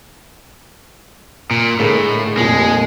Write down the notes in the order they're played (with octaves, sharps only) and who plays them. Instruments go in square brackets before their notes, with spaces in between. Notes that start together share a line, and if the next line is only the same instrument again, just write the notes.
[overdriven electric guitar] A#2
[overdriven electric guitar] A2 [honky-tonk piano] D3 G#3 A#3
[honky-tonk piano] F1 D#2 A#2 [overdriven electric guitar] G#3